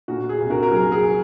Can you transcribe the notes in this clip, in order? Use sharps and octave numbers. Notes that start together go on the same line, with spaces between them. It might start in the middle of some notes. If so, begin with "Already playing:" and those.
A#2 F#4
G#4
C2
F#4 A#4
A#4
F#3 G#4
G#4